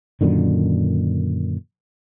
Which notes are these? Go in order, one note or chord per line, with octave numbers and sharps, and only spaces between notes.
F#2 A#2 D3 D#3